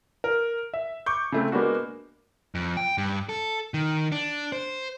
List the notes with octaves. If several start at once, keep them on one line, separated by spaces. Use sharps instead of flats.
A#4
E5
C#6 D6 G6
C#3 A3 C4
G#3 A#3 B3 D4 F#4
F2
G5
G2
A4
D#3
D4
C5